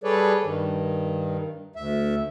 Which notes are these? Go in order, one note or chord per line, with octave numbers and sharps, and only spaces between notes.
G3 G#4 A4 B4 C#5 D5
G2 D#3
D2 E5